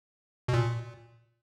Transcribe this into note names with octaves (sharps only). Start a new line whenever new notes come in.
B2
A#2